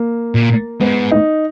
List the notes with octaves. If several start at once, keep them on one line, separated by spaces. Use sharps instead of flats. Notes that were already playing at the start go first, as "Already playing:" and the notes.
Already playing: A#3
A#2
G#2 B3
D#4